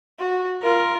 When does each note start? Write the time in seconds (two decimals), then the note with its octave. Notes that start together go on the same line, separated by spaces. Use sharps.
0.19 F#4
0.63 F4 A#4